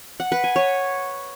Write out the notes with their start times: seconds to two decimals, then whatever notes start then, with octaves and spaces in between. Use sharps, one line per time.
0.20 F#5
0.32 B4
0.44 G#5
0.56 C#5